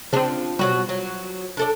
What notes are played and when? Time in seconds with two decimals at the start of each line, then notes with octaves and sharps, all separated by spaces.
0.13 C#3 F3 C4 D4
0.59 B2 F#3 G3 F#4
0.89 F#3
1.57 D4 A4 D5